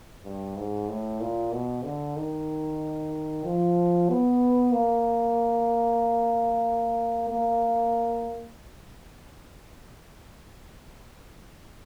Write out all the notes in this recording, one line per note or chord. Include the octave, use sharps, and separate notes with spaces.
G2
G#2
A2
A#2
B2
D3
D#3
F3
B3
A#3
A#3